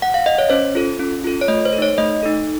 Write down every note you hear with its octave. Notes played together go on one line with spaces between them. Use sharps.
F#5
F5
D#5
C#5
C#4 C5
F4 A4
C#4
F4 A4
C#5
A3 D#5
C5
A4
D#4 C#5
A3 D#5
D#4 A4